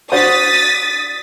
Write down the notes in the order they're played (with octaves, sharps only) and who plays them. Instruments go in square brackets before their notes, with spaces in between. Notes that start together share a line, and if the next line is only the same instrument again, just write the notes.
[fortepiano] D4 F#4 C5 [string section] D#6 A6 B6